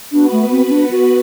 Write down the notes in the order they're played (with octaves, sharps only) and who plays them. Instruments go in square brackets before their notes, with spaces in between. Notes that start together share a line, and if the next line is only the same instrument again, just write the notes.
[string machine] B3 F#4 B4 [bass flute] D4
[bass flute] A3
C4
C4
D4
F#4